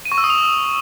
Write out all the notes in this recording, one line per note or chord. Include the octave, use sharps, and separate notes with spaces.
D#7
C#6
E6
D#6
F7